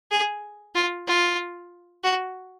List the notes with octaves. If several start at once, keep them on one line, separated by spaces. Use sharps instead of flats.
G#4
F4
F4
F#4